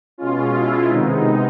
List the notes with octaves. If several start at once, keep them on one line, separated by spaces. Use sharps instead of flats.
B2 G#3 C#4 F4
E4
C3 D#3 G#3 B3 D#4